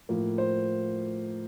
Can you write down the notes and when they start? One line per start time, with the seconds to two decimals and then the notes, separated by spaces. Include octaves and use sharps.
0.09 A2 F3 A#3
0.38 C5